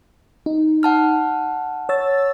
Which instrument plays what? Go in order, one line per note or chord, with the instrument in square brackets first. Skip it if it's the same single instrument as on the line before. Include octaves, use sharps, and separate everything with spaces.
[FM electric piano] D#4
[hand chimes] F#5 A5 F6
[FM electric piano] C#5 E6 A6